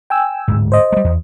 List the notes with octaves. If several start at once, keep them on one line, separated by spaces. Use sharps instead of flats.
G5 G#5 E6
D1 G#2
C5 D#5
G3 G#3
E2